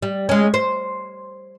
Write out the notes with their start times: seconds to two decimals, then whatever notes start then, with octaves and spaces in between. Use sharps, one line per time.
0.03 G3
0.29 G#3 C#4
0.54 C5